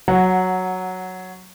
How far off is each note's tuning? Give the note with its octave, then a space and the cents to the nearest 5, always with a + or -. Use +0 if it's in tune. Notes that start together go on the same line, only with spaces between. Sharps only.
F#3 +0 F#5 -15